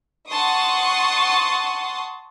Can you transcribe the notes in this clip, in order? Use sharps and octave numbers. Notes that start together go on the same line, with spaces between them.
F#5 A5 C6 C#6 D#6